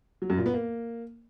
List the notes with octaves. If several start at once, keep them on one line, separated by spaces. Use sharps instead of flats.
F#3
F#2
A#2
B3
A#3